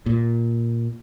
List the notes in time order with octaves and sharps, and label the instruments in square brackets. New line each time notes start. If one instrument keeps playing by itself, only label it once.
[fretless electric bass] A#2